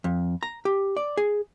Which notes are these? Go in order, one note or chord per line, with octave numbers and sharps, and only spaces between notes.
F2
A#5
G4
D5
G#4